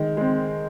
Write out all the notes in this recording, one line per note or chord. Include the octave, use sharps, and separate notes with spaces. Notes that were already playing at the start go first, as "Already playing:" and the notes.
Already playing: D#3 G#3
G#3 C4